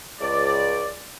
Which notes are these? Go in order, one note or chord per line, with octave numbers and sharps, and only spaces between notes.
C#2 D5